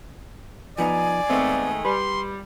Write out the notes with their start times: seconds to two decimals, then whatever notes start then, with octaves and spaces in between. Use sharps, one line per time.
0.78 F3 B3 D#4 D5 G#5
1.30 D#3 G#3 A3 B3 C4
1.85 G3 B4 C6